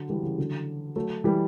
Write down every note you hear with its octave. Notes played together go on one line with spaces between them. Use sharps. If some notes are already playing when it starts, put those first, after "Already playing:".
Already playing: D3 F#3
E3 G3
C#3 E3
D3 F#3
F#3 A3
E3 G3